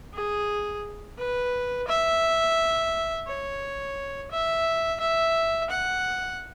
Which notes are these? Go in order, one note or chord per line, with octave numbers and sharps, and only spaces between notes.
G#4
B4
E5
C#5
E5
E5
F#5